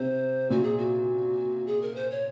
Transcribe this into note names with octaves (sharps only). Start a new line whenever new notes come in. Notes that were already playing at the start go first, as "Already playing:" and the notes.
Already playing: C3 C5
A#2 F#4
G#4
F#4
G#4
A#4
C5
C#5